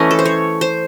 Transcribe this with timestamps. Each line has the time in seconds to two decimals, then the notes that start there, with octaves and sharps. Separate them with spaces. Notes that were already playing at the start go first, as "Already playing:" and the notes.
Already playing: E3 A3 C#4 D#5
0.11 A4
0.19 C5
0.25 C#5
0.61 C5